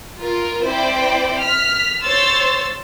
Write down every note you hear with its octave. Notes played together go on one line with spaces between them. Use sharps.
F4 A#4
C4 E4 C5 D5 G5
F6 B6
C5 C#5 C6 E6 A6